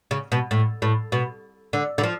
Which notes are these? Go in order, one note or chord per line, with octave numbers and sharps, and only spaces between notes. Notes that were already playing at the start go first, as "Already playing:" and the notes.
C#3
B2
A2
A2
B2
D3
D3
F3